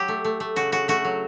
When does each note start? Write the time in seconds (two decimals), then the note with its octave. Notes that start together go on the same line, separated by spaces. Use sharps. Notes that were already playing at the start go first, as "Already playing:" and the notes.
Already playing: F#3 G4
0.08 A3
0.25 A3
0.40 A3
0.56 C#3 F#4
0.72 C#3 F#4
0.88 A3 F#4
1.05 F#3